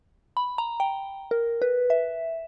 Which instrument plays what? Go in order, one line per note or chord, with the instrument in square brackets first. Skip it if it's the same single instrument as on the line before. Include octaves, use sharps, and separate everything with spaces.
[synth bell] B5
A#5
G5
A#4
B4
E5